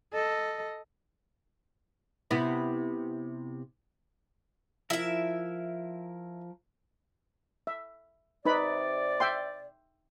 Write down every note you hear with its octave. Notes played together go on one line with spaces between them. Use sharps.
A4 D#5
C3 B3 E4
F3 E4 A#4 E5
E5
C3 D#4 B4 D5 B5
E5 G5 C6